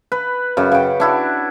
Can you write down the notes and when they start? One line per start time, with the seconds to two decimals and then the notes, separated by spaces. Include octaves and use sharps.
0.12 B4
0.57 F#2 C#3
0.72 C#3 G5
1.00 D4 E4 F#4